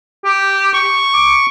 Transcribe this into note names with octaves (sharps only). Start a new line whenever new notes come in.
G4
C#6
D6